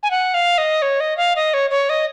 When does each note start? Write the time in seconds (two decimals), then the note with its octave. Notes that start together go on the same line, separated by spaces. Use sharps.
0.03 G#5
0.11 F#5
0.34 F5
0.58 D#5
0.82 C#5
1.00 D#5
1.17 F5
1.36 D#5
1.54 C#5
1.71 C#5
1.90 D#5